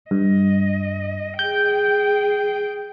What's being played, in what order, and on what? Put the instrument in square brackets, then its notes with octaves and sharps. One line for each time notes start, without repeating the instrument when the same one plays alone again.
[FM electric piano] G2 [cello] D#5
[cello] G#4 G5 [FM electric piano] G6